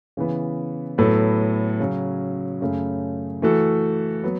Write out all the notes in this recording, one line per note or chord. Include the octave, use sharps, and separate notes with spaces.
C#3 E3 B3
A2 F#3 B3 A4
C#3 F#3 C#4 F#4
F#2 C#3 A3
E3 A3 F#4 A4
F#3 B3